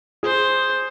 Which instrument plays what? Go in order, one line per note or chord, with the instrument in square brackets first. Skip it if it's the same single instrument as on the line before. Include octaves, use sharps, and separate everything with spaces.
[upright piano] G#4 [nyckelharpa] C5